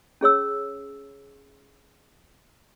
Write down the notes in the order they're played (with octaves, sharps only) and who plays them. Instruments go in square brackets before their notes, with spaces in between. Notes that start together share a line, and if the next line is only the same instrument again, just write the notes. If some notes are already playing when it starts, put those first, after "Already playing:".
[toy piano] C#4 G#4 C#5 E6